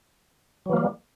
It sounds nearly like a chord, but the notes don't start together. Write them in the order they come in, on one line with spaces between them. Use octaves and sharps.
F#3 E3 A#3 G3